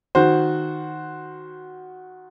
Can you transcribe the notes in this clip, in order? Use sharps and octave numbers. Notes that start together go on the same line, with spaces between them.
D#3 F#4 C5